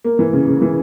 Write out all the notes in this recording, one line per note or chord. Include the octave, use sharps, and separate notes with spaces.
A#3
E3
C#3
C#3
E3